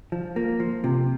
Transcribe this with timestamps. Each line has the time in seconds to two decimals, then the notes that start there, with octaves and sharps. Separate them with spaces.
0.12 F3
0.36 A#3
0.60 F3
0.84 C3